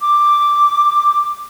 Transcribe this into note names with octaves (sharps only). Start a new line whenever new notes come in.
D6